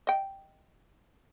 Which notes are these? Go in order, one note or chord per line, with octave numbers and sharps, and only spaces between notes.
D#5 G5